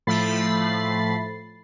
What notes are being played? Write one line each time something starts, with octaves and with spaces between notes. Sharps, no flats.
A2 F3 A3 B5 A6 C7